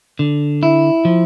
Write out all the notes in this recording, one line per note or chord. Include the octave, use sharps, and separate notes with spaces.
D3
E4
F3